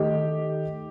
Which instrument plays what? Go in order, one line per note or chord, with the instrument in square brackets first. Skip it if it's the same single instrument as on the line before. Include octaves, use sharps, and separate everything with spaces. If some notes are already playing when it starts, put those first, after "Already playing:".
Already playing: [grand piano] D#3 A3 D#4 A4 D#5 [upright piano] G4